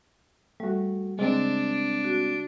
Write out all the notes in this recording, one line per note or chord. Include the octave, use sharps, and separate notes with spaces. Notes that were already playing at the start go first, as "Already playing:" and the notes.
G3 A3 F#4
C#3 G#3 C4 D4
F#4